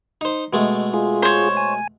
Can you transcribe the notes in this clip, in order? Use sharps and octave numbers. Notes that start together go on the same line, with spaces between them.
D#4 C5
B2 G#3 A3
F4 G#4
C5 C#5
G#5